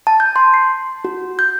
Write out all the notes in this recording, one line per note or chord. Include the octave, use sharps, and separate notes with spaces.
A5
G6
C6
C7
F#4
G6